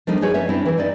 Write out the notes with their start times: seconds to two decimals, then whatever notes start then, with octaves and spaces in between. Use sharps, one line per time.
0.07 F3 G3 A3 A#3 D4 D#4
0.21 D#4 F#4 G#4 B4 C#5
0.34 A3 C#4 B4 C#5 E5
0.49 C4 D4 E4
0.66 E3 C4
0.78 D#4 E4 D5